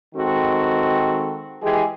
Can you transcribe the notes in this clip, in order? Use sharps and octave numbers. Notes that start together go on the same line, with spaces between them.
D#3 G#3 C4 F#4 A4
E3 G#3 G4 G#4